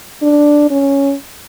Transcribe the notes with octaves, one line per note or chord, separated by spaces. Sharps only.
D4
C#4